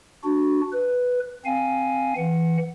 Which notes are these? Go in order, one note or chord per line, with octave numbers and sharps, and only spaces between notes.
D4 F#4
B4
C4 F5 G#5
E3 F#5